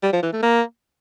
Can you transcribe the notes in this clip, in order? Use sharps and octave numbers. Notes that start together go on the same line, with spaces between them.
G3
F3
E3
A3
A#3